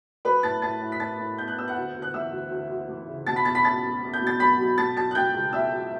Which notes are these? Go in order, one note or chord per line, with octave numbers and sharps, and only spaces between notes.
F#3 B4 B5
A2 A5 A6
A2 A5 A6
A2
B6
A2 A5 A6
A2
B3 G6
F#6
B3 E6
F#5 F#6
D2
D2
F#6
E3 E5 E6
D2
D2
D2
E3
C#3
B2 A5 A6
B5 B6
E2 A5 A6
B5 B6
C#4 A5 A6
E2
E2
G6
B2
A6
F#3 B5 B6
F#3
B2 A5 A6
F#3 A5 A6
F#6
B2 G5 G6
C#2
B2 E5 E6
F#3